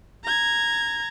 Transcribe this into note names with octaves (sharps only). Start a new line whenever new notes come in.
A#5 G#6